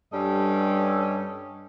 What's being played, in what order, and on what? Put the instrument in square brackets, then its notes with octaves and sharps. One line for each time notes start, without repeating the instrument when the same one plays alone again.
[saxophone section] G2 G3 C#4 A4 D#5